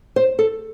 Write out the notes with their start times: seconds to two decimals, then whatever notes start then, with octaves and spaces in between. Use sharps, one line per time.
0.16 C5
0.39 A4